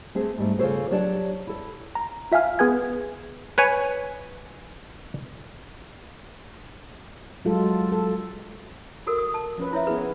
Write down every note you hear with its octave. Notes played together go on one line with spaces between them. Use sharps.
A3 C4 G#4
G#2 G3 A3
C#3 F4 G4 A4 C5 C#5
F#3 D4 G4 C#5 D5 A5
E4 A4
A#5
F4 E5 F5 G#5 F6
B3 G#4 B4 G#5 G#6
B4 C#5 G#5
F#3 G#3 F4 A4
A4
F#4 A4 A#4
D#6
A5
F3 C#4 B4
E4 C#5 E5
B3 E4 G#4 B4